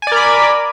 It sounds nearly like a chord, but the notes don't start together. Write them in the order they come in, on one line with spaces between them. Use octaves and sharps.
G#5 D5 A#4 B5